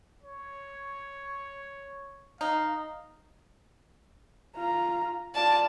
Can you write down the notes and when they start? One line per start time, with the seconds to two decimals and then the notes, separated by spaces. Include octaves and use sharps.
0.23 C#5
2.41 D#4 F5
4.56 F4 A#5
5.35 F4 D5 A5